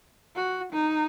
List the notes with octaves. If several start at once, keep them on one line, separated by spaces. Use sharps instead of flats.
F#4
D#4